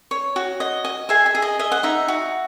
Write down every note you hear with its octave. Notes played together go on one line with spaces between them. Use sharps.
C#5
F#4
D#5
D#5
G#4 E5 G#5
E5
G#4
D#5
D#5 E5
F#5
D#4 E5
F#4